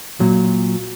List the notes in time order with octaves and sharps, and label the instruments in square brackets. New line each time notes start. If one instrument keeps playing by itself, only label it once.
[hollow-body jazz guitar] A#2 F#3